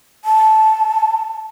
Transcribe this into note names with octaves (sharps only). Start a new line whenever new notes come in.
A5